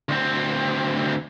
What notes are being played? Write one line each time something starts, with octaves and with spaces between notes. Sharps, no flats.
D2 C4